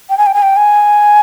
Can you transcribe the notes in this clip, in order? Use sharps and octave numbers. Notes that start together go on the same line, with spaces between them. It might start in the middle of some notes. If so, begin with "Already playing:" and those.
G5
G#5
G5
G#5
G5
G#5